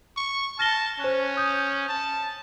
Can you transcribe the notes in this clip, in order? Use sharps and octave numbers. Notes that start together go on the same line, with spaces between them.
C#6
A5 F6 A#6 G7
C#4 C5 F#6
D#6 G6
A5